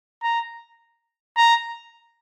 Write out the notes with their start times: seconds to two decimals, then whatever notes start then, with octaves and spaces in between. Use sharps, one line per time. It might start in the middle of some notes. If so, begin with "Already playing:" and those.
0.23 A#5
1.37 A#5